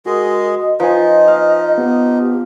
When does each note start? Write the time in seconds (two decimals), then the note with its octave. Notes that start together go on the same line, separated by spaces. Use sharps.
0.06 G#3 F#4 G#4 A#4 D#5
0.60 D#5
0.80 F3 D#4 B4 D#5 G#5
1.28 F5
1.78 B3 G4